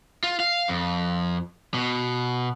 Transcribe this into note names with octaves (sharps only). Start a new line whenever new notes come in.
F4
F5
F2
B2